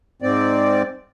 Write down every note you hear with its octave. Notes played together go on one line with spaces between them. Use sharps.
G#2 C4 D5